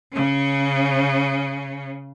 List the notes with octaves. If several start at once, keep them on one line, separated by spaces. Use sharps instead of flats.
C#3 C#4